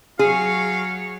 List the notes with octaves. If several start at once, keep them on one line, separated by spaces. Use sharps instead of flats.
F#3 G#4 C#5 F5